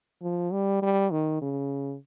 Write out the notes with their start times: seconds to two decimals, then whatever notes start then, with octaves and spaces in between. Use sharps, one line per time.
0.23 F3
0.53 G3
0.82 G3
1.11 D#3
1.42 C#3